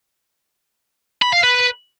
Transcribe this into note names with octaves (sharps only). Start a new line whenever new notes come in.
B5
F5
B4